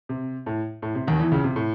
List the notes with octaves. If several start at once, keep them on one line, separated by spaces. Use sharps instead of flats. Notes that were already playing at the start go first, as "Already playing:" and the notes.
C3
A2
A2
C3
D#2 D#3
E2 E3
C#2 C#3
C3
A2